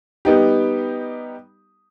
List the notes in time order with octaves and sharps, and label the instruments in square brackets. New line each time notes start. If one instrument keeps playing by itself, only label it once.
[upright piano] G3 B3 D#4 G4